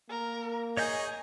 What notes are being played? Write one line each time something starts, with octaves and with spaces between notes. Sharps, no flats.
A#3 A#4
D#4 G#4 C#5 D#5 G#5 G6